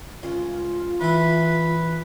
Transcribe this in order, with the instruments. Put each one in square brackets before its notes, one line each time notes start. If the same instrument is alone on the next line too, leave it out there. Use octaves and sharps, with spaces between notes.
[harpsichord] C#2 [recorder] F4
[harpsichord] E3 E4 [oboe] B4